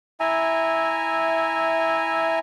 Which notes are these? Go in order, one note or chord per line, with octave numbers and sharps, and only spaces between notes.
E4 E5 G#5 A#5